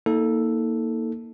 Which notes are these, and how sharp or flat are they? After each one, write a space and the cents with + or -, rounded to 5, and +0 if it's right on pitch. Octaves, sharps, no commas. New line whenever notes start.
A#3 +0 D#4 +35 A4 +0